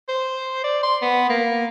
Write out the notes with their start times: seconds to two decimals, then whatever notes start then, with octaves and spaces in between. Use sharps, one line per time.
0.09 C5
0.64 D5
0.83 C6
1.02 B3
1.30 A#3